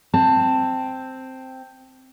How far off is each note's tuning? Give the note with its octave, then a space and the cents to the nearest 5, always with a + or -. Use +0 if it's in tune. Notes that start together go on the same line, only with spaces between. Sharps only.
C4 +0 A5 +10